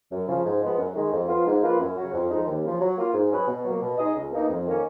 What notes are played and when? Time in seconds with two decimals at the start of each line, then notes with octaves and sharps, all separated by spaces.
0.12 F#2
0.28 C#3 F3
0.45 G#2
0.61 F3 G#3 B3
0.78 F#2
0.96 D#3 G#3
1.12 F2
1.29 F3 B3 F4
1.47 G#2
1.63 F3 A#3 F4 B4
1.80 F#2
1.97 C#3 F#3 C#4 F#4
2.13 F2
2.31 F3 G#3 D#4
2.47 D#2
2.64 C#3 F3
2.80 F#3
2.98 A#3 F4
3.14 G#2
3.31 F#3 C#4 G#4 B4
3.48 B2
3.65 F#3 A#3
3.81 B2
3.98 G#3 D#4 G#4 D#5
4.16 C#2
4.33 B2 A#3 D#4
4.49 F2
4.67 D#3 A#3 C#4